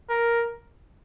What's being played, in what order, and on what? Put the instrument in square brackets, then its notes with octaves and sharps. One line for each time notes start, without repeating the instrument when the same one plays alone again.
[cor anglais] A#4